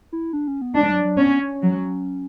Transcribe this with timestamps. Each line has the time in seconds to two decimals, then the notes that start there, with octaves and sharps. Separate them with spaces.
0.13 E4
0.33 D4
0.48 C#4
0.62 B3
0.75 G#3 D4
0.91 F#3
1.04 F#3
1.18 B3 C#4
1.40 C#4
1.62 F#3